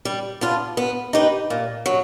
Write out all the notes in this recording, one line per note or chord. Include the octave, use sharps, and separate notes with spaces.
G3
B3 D4 F4
B3
D#4 G4 B4
A#2
F#3